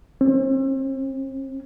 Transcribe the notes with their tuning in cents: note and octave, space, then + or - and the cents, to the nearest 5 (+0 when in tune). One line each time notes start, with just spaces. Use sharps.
C4 +40